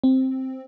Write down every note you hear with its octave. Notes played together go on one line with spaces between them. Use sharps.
C4